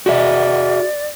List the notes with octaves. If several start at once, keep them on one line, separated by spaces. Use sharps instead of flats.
F#4 G#4 D5 E5